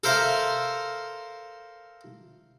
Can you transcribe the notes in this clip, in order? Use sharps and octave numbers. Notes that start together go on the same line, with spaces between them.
A4 A#4 C5 E5 F5